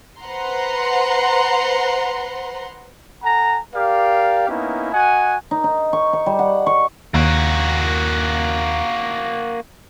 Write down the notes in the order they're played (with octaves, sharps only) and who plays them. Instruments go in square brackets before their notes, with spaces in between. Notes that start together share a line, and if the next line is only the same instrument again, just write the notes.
[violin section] B4 C5 F#5 A#5 C6
[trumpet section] A4 F#5 G#5 A#5
G4 A#4 D5 F5
A#3 B3 C#4 D#4 E4
F#4 D#5 F#5 G#5
[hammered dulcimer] D#4
D#4
C#6
C#6
G3
F#5
C#6
[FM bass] D#2 [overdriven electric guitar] A#3 F#4